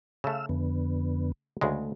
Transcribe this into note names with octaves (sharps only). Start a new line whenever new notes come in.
C#3 A3 F5 E6
F2 D3 B3
D2 C#3 G#3 A3